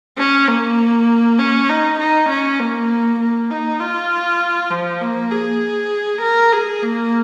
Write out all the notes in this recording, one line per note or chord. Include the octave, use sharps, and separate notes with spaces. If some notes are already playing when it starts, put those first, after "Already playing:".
C#4
A#3
C#4
D#4
D#4
C#4
A#3
A#3
D#4
F4
F3
A#3
G#4
A#4
G#4
A#3